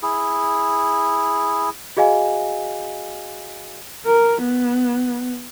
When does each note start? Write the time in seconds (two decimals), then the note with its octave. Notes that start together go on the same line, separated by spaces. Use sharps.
0.03 E4 G#4
1.97 F#4 G#4 D#5 F5 G#5
4.06 A#4
4.43 B3